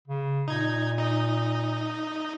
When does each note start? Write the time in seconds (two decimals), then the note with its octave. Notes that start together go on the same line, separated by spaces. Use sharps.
0.07 C#3
0.48 A#2 D#4 G#6
0.98 D#4 D#5